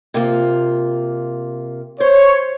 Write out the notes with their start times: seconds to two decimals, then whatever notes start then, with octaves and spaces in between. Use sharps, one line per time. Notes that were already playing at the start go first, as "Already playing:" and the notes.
0.14 C3 A#3 F4
2.00 C5 C#5